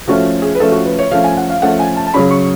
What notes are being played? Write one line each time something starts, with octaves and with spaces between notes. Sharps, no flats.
F3 A3 C#4 F#4
G#4
B4
F3 A3 C#4 A4
F#4
B4
C#5
F3 A3 C#4 F5
G#5
F#5
F5
F3 A3 C#4 F#5
G#5
A5
A5
C#3 F#3 C#4 B5
C#6